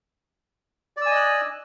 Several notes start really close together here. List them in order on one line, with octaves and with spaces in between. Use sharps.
D5 E6 G#5 D#5 F#6